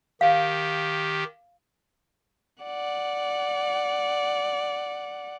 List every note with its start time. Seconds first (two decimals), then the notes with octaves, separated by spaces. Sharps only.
0.21 D#3 G4 F5
2.64 D5 F#5